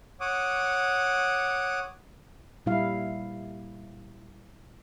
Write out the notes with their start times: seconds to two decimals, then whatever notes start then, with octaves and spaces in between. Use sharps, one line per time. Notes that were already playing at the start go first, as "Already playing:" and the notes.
0.20 C#5 F#5 D6 D#6
2.66 A#2 G3 E4 F5